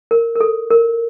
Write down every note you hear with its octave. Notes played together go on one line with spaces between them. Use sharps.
A#4
A#4
A4
A#4